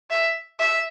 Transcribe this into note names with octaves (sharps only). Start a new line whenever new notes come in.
E5
E5